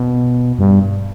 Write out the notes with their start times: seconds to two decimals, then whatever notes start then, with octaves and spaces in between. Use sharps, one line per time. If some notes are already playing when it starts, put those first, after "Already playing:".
Already playing: B2
0.59 G2